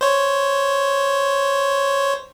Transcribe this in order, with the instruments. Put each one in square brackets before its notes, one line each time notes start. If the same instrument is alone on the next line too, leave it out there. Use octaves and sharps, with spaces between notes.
[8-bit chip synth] C5 C#5